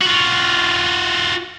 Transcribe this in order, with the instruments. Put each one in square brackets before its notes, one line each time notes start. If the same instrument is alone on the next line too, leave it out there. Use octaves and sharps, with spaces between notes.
[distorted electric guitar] F4 F#4